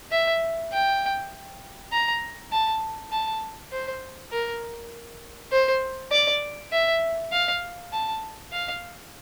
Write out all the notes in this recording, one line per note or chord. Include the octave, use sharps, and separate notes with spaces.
E5
G5
A#5
A5
A5
C5
A#4
C5
D5
E5
F5
A5
F5